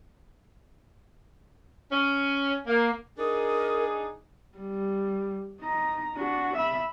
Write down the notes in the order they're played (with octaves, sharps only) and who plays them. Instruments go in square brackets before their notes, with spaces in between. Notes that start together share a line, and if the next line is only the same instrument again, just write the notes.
[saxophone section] C#4
A#3
[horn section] D4 D#4 G#4 [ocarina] A#4
[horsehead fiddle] G3
D#4 A#5
D4 F#4
E5 B5